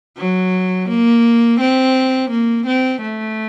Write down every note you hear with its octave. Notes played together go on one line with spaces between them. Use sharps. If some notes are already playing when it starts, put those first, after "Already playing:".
F#3
A#3
C4
A#3
C4
A3